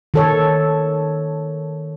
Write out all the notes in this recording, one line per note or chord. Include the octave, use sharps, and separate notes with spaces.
D#3 A4 C#5